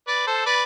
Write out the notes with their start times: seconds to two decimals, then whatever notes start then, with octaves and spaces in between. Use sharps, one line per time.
0.07 B4 D5
0.27 A4 C5
0.46 B4 D5